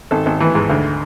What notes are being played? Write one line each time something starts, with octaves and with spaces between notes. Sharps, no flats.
G#1 A4
G#1
E3
G#2
D2